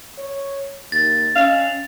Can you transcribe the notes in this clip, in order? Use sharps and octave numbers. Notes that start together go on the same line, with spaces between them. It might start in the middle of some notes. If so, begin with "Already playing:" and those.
C#5
D#2 A6
C#4 F5